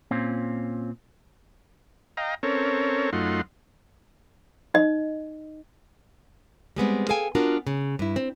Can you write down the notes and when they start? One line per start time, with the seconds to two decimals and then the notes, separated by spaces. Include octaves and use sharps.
0.11 A#2 C4 C#4 F4
2.17 D#5 F5 G5 A#5
2.43 C4 C#4 A4 A#4 C#5
3.13 F#2 A3 D#4 F4 F#5 C6
4.74 D#4 D#5
6.76 G3 G#3 B3 C4
7.09 G#4 A4 F5 G5 G#5
7.35 B3 D4 F4 F#4 A#4
7.67 C#3
7.99 G2 E4
8.16 C4